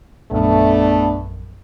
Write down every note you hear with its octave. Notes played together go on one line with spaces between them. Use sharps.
A#1 F#2 A3 B3 D4